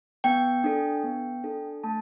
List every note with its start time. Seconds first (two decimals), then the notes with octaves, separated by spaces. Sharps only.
0.24 B3 G5
0.64 D4 A4
1.04 B3
1.44 D4 A4
1.84 A3 A5